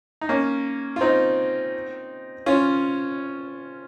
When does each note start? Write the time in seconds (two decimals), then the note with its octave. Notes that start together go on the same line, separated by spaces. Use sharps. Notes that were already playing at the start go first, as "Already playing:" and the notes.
0.21 D#4
0.29 A#3 C#4
0.96 F4
1.01 C4 D#4
2.46 C#4 F4